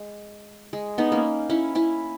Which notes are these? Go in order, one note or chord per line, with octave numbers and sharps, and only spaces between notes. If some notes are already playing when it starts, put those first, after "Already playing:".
Already playing: G#3
G#3
B3 D#4
A#3 C#4
C#4 E4
C#4 E4